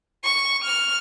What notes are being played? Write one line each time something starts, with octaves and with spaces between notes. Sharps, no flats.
C#6
F6